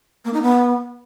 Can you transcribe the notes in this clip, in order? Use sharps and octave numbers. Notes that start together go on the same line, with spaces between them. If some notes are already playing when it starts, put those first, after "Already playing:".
A#3
D#4
B3